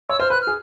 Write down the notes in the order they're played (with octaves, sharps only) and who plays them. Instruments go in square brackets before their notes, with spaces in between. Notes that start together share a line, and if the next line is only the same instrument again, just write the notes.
[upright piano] C#5 [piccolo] E6
[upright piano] C5 [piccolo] F6
[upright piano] B4 [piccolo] F#6
[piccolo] F6
[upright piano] G#4